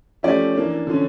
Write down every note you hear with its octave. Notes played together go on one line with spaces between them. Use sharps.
F3 A3 C#4 G4 D5
E3 A#3 D4
D3 F3 C#4